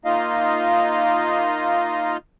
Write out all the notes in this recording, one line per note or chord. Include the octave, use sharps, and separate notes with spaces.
A#3 D#4 F4 D#5 F5